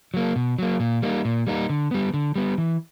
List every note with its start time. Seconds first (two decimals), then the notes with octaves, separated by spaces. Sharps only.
0.14 F#3 A#3
0.36 B2
0.59 F#3 A#3
0.80 A#2
1.02 G3 A#3 D#4
1.25 A#2
1.47 G3 A#3 D#4
1.70 D3
1.91 G3 B3
2.14 D3
2.36 G3 B3
2.58 E3